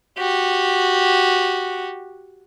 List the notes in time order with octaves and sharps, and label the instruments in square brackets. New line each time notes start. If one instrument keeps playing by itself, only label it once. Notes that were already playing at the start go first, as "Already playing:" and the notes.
[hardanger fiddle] F#4 G4